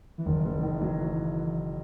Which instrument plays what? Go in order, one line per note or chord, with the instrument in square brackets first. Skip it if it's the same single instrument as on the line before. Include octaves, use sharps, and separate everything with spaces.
[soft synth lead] E3
[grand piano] F#1 [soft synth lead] D#3
[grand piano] F#1 [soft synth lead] E3
[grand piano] D#3
F#3